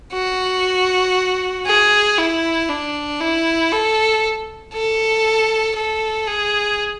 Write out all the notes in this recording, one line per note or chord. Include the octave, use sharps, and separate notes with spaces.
F#4
G#4
E4
D4
E4
A4
A4
A4
G#4